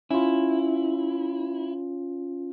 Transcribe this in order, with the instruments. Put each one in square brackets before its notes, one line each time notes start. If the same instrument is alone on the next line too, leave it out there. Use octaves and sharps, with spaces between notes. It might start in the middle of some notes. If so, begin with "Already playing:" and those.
[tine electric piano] C#4 F4 [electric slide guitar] E4